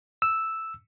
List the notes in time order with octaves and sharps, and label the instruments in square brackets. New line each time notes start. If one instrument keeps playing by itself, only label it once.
[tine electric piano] E6